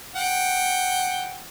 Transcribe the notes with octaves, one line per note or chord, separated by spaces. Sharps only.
F#5 G5